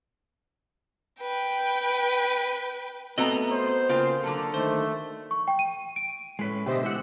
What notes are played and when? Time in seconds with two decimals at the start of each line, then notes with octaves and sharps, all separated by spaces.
1.22 B4 G5
3.18 A3 B3 C4 F#4 A4 D#5 A#5
3.51 C5
3.89 C#3 A#3 F4 G5
4.23 D3 F#3 A4
4.54 D#3 A3 C5
5.31 C#6
5.48 G5
5.59 D#7
5.96 D7
6.39 A2 G#3 C#4 B4
6.66 B2 D3 A3 G4 C5 D#5 E5
6.83 C#3 E3 G#3 G4 F#5 E6 F#6